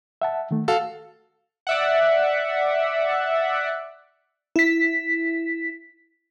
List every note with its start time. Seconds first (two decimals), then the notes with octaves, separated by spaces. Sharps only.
0.22 E5 F#5 A5
0.51 D#3 A3
0.68 F#4 A4 F5
1.67 D5 E5 F#5
4.56 E4 B6